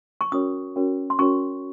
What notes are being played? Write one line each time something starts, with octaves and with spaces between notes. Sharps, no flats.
C#6
C#4 F#4 A#4 C#5 D#6
C#4 F#4 A#4 C#5
C6
C#4 F#4 A#4 C#5 C#6